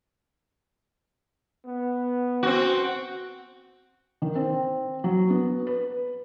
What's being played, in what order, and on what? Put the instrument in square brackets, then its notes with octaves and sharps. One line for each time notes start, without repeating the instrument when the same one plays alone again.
[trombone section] B3
[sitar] C4 F#4
[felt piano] D#3
C4
F#3
B3
B4